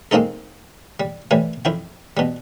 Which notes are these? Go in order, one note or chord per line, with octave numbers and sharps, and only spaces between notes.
G#3 A#3 C4 D#4 A4
G3
A2 E3 G3 G#5
F2 E4 G5
B2 G3